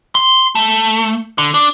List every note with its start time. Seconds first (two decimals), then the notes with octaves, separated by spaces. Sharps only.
0.15 C6
0.55 A3
1.38 D3
1.54 D4